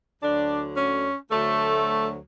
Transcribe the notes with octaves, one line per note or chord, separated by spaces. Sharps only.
D2 D3 F#3 D4
C#4
D2 D3 F#3 A3